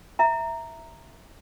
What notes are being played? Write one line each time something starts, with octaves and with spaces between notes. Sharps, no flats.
E5 A#5